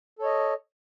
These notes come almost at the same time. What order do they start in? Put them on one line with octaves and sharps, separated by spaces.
A4 C#5 D#5